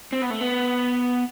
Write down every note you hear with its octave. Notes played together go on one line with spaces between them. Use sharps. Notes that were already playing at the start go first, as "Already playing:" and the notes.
C4
B3
A3
B3